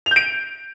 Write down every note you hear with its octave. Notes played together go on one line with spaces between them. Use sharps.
G6 D7 F7